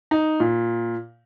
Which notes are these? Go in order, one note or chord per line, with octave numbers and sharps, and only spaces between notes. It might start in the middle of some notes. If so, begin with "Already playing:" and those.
D#4
A#2